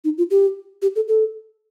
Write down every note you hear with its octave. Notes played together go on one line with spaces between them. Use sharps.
D#4
F4
G4
G4
A4
A4